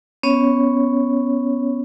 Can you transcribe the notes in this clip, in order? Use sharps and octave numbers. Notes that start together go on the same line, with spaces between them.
B3 C#4 C#5